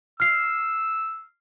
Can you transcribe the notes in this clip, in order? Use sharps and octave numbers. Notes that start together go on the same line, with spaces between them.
E6 F6 C7